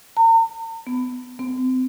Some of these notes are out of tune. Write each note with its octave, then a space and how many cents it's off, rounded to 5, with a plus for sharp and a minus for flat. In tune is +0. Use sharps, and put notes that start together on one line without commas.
A#5 -45
B3 +20
C4 -25